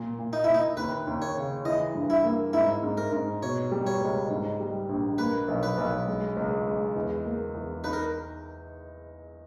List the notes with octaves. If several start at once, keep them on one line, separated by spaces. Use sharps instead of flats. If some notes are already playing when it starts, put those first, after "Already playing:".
Already playing: A#2
A#2
D#4
A#2 E4
D#4
D#2 B4
D#2
C#5
C#3
E3 D#5
G2
E4
A#3
G#2 E4
G#2
A#4
G#2
B2 C#5
G3
C#5
C#2
G#2
G3
A#1
A#3 B4
B1
B4
B1
G#3
C#2
G#3
E2
A#3
E2
D#4 B4
A#4